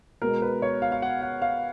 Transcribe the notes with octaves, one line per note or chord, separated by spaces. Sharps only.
B2 G#3 B3 A#4
B4
C#5
F5
F5
F#5
F#5
F5